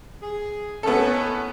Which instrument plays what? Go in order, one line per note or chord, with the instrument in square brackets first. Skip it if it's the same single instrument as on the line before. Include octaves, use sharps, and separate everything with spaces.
[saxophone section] G#4
[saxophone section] A2 D#3 C#4 [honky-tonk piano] B3 A4